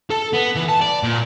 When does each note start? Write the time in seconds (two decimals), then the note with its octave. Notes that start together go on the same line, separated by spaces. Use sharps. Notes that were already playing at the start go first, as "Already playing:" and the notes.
0.11 A4
0.34 B3
0.56 E3
0.69 A5
0.82 D5
1.03 A#2